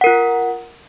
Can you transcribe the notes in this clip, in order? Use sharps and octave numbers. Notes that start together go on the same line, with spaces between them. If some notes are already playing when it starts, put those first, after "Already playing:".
F4 A#4 F#5